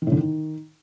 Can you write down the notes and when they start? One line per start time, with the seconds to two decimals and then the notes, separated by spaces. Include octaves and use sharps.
0.02 D#3
0.07 A2
0.12 D3
0.17 D#3